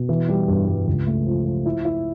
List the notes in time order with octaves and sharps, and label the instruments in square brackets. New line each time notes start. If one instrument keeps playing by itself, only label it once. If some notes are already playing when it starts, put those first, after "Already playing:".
Already playing: [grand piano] B2
E3
G3
G2
G2
C#2
A3
F3
F3
E4
E4